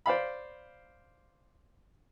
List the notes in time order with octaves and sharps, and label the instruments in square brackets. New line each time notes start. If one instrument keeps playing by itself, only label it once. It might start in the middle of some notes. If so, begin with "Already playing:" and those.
[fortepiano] C5 D5 F5 B5